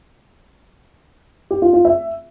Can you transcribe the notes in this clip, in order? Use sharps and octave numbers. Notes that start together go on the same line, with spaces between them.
G4
F4
F4
E5